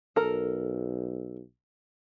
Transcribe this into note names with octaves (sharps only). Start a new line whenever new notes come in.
B1 A4 A#4